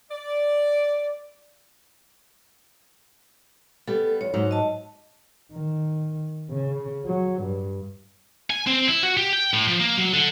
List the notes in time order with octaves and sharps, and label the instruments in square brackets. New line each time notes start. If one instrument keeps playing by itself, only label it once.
[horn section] D5
[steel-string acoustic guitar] G3 B3 [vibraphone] A4
[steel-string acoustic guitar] E2 [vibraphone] C#5
[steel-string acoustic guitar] G#2 F#3
[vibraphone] D#5 A5
[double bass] D#3
C#3
F#3
G2
[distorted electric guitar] G#5
C4
E4
F#4
G4
G5
A2
F3
A#3
F#3
D3